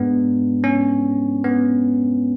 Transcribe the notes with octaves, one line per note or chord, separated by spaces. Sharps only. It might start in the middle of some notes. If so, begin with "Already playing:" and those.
Already playing: G#2 G#3 B3 D4
C#4
B3